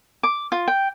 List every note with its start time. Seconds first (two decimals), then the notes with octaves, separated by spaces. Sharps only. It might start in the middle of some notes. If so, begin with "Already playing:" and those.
0.23 D6
0.52 F4
0.68 G5